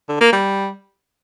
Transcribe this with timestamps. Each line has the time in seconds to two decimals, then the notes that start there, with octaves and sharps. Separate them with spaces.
0.09 D3
0.21 A#3
0.33 G3